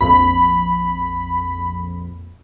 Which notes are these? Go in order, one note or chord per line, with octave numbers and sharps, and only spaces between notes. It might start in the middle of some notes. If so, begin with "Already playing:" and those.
A#1 F2 B5